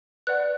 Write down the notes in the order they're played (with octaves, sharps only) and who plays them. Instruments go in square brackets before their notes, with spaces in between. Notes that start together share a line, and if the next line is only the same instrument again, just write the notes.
[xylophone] B4 D5 F#5 F#6